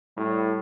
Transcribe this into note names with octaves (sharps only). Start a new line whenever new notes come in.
A2 G3